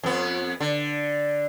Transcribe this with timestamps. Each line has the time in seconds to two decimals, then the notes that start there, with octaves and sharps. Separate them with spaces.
0.03 F2 B3
0.60 D3